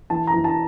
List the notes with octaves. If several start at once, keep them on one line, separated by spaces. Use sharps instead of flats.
E3 A5
A#5
E3
A5